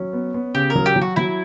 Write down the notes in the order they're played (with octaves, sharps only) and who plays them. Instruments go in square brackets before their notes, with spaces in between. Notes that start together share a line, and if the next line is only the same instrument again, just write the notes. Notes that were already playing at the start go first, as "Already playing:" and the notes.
Already playing: [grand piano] F#3 [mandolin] C#4
[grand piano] B3
B3
[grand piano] C#3 [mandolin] G4
[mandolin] A#4
[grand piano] F#3
[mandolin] G4
[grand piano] F#3
[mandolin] F#4
[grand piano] F#3 [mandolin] E4